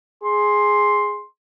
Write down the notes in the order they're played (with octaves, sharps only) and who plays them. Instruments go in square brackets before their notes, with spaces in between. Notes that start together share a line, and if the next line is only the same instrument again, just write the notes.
[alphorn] G#4 [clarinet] C6